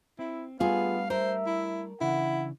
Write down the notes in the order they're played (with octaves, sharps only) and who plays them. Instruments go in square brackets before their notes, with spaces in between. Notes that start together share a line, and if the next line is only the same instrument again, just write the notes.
[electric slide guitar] C4 [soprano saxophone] E4
[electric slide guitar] G3 A3 D4 [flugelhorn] B3 [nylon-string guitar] F4 G#4 [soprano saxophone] F5
[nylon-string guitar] A#4 [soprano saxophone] C5 [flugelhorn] E5
[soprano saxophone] E4
[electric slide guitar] C#3 E3 D4 [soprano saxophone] E4 [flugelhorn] F#5